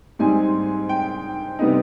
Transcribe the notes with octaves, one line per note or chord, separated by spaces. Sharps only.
G#2 G3 C4 D#4 G#5
G5
C3 G3 B3 D#4